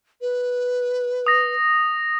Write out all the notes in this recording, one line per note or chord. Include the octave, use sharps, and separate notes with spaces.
B4
D#6 A#6